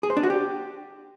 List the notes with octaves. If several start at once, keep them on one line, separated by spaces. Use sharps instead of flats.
G#4
C5
D4
F#4
G4